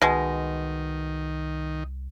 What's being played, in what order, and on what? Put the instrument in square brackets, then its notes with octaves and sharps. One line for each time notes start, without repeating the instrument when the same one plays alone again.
[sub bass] C2 [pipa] B2 G#3 [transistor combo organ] D#3